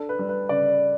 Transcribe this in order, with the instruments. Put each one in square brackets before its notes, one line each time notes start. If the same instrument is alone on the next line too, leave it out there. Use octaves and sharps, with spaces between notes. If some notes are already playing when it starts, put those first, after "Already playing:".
Already playing: [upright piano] D4 A4
B4
G3
B4
C#3 D5